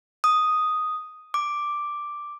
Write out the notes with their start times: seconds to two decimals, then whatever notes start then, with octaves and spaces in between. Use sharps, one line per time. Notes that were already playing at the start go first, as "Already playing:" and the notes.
0.24 D#6
1.34 D6